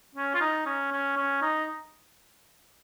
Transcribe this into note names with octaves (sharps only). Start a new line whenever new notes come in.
C#4
F4
D#4
C#4
C#4
C#4
D#4